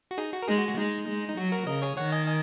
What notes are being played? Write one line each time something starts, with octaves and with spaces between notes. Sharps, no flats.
F#4
D#4 G#4
F#4
A#4
G#3 D#4 G#4
F#4
F#4
G#3 D#4
G#3
D#4
F#3 F#4
F#4 A#4
C#3 A#4 D#5
G#4 C#5
D#3 C#5 F#5
D#5 G#5
D#5 G#5